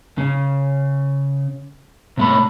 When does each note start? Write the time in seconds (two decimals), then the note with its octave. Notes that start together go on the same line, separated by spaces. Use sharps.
0.18 C#3
2.17 C3 A3 B5